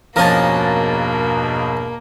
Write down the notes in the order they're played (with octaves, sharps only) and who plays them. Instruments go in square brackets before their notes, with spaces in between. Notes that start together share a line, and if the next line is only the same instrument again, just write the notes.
[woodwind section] E2 G2 B2 [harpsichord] F3 C#4 [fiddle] A#3 [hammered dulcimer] A#4 A5